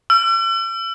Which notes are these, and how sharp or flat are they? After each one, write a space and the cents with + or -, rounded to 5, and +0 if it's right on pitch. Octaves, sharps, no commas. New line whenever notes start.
E6 +40